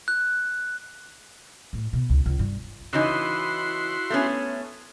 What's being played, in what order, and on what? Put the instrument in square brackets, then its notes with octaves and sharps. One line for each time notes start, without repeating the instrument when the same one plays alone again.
[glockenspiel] F#6
[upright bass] A2
B2
C#2
C#2
G2
[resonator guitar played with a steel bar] C#3 E3 D#4 [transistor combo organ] E4 F#4 C6
[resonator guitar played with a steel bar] A3 B3 C#4